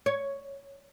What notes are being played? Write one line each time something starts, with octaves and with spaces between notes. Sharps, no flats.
C#5